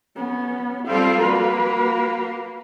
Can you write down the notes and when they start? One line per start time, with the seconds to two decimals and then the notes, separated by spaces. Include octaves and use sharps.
0.16 B3 C#4
0.87 G3 C4 F4 A4 F5
1.19 A#3 F#4 B4